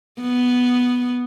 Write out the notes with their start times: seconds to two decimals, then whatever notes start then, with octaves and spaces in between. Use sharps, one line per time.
0.21 B3